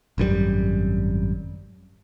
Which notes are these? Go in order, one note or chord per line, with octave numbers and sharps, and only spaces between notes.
G#1 F#2 D#3 G3